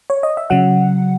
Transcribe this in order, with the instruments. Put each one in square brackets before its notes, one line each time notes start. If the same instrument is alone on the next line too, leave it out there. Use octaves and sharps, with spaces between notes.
[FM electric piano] C#5
D#5
E5
C#3 F#3 F#5